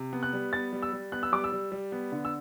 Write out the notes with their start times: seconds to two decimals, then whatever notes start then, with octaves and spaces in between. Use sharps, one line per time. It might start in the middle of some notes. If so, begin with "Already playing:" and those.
Already playing: C3
0.13 B3
0.23 F#6
0.33 G3
0.53 B3 A6
0.73 G3
0.82 E6
0.93 G3
1.12 B3 F#6
1.23 E6
1.32 G3 D6
1.44 E6
1.52 G3
1.72 G3
1.92 B3
2.12 D3
2.25 E6